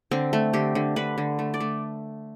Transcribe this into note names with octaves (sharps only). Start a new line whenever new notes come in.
D3 C4
A3
D3 G4
D3
D3 B4
D3
A3
D5
A3